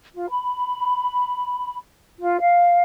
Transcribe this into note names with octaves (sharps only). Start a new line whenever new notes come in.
F4
B5
F4
F5